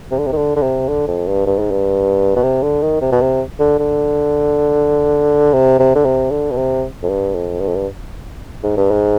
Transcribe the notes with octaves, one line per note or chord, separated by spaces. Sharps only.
C3
D3
C3
D#3
D3
D3
C3
D3
F2
G2
G2
G#2
G2
B2
C3
D3
D#3
C3
B2
C3
D3
D3
C3
C3
D3
C3
D3
B2
C3
F2
G2
F2
G2
F2
G2
G#2
G2
G#2